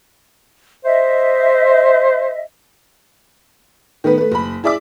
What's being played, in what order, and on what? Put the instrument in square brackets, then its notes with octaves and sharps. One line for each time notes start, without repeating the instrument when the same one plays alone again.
[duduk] C5 [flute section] D#5 E5
[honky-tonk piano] D#3 A3 B3 B4
A3 B4
F#1 B5
E4 G#4 D5 E5 D6